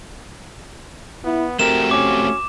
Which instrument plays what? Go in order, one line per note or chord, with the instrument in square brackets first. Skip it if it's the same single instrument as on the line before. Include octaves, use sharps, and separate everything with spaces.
[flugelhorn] B3 [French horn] E4
[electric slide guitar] A3 C4 G4 [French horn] F#4 [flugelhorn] A#4 [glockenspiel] E7
[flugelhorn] C#4 [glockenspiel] D6